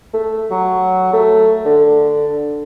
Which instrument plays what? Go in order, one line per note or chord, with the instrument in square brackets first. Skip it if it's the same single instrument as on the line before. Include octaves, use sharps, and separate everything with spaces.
[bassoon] A3
F#3
A3
D3